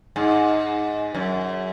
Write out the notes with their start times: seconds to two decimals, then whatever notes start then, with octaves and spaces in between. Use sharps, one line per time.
0.16 G#2
1.15 F#2